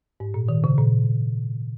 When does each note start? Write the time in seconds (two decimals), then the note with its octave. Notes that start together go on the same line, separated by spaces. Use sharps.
0.20 G#2
0.34 A#2
0.49 D#3
0.64 C#3
0.78 A#2